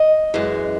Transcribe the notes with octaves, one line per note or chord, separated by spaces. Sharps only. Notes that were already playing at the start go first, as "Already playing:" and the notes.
Already playing: D#5
F#2 E3 G#3